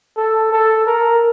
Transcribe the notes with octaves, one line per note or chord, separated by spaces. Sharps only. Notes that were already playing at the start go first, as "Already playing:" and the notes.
A4
A4
A#4